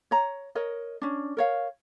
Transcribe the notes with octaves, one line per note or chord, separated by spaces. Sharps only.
C#5 A#5
A#4 C#5 D#5
C#4 D4
A#4 C#5 F5